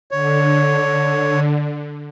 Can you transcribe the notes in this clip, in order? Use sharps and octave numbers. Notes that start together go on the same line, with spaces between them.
D3 C#5